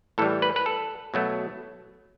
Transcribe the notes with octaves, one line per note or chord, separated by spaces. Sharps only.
A2 E3 G3 A4
B4
B4
A4
B2 F#3 A3